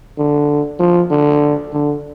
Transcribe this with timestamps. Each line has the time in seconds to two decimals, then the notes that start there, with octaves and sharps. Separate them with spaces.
0.18 D3
0.79 F3
1.11 D3
1.73 D3